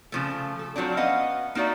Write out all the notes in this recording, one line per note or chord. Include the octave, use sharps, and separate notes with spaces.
C#3 F3 A3
A4
F3 F#3 C4 D4
B3 C#4 D#5 F5 F#5
A#3 D#4 F#4 D5 E5